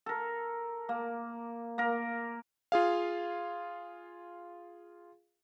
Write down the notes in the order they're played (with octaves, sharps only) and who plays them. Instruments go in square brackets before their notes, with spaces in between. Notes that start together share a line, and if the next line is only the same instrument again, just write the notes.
[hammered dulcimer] A4 A#4
A#3
A#3 A#4
[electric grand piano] F4 G#4 F5